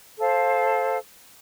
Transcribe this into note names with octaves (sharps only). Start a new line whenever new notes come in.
A4 C5 F5